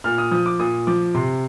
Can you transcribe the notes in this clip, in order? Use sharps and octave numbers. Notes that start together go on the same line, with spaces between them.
A#2 F6
D#6
F3 D#6
D6
A#2 D#6
F3 D6
C3 C6